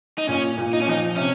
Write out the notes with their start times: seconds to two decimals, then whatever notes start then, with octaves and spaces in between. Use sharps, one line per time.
0.18 D#4
0.28 A#2 C#4
0.58 A#2
0.73 D#4
0.81 C#4
0.88 F3 D#4
1.16 C3 C#4